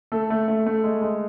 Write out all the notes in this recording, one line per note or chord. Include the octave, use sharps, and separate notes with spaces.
A3 A4
A3
A3
A3
G#3
G#3